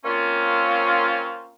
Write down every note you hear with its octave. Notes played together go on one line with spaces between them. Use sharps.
A#3 C4 C#4 F4